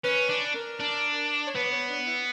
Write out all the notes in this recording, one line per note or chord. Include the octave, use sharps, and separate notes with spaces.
C#4 B4
D4
A#4
D4
C#5
B3 B4
C#5
D4
E4